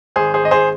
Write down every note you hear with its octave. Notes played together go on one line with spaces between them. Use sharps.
G#1 G#4 C5
G#4 C5
G#1 D#5
G#4 C5